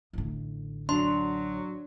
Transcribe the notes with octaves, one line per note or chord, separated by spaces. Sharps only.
A1 D3
F#3 D4 C6